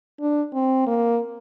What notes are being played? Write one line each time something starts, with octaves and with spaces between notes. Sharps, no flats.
D4
C4
A#3